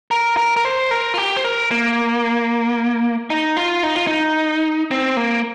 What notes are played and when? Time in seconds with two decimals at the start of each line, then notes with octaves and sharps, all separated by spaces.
0.11 A#4
0.37 A#4
0.57 A#4
0.65 C5
0.91 A#4
1.14 F4
1.18 G4
1.36 C5
1.44 A#4
1.71 A#3
3.30 D#4
3.57 F4
3.83 D#4
3.96 F4
4.07 D#4
4.91 C4
5.17 A#3